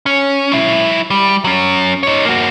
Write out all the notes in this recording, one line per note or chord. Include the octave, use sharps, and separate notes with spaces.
C#4
F#3 E4
G3
F#3 C#4
D#4 C#5
A#3 F#4